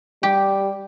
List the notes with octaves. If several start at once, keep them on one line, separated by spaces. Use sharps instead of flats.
G3 G4